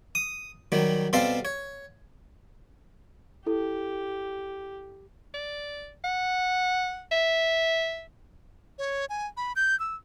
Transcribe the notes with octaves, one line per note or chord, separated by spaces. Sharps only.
D#6
D#3 F#3 G3
B2 G3 C4 A4 F5 C6
C#5
E4 G4 A4
D5
F#5
E5
C#5
G#5
B5
G6
E6